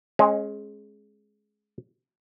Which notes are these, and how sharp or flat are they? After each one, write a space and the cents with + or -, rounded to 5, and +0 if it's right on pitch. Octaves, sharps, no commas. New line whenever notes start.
G#3 +15 C#4 -25